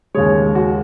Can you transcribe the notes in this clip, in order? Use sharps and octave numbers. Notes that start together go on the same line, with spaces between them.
D#2 C#3 G#3 G#4 C#5
F#4